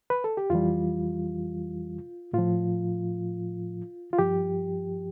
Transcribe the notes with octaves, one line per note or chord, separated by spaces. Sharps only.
B4
A4
G4
F2 E3 G3 F4
A2 F3 F4
F4
G2 F3 G4